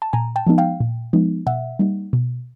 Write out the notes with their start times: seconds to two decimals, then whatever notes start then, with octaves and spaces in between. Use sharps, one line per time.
0.02 A5
0.13 A#2 G#5 A#5
0.36 G5 A5
0.47 F3 G#3 B3 D#4
0.58 F5 G5
0.80 A#2
1.13 F3 G#3 B3 D#4
1.46 B2 E5 F#5
1.79 G3 A#3 D#4
2.13 B2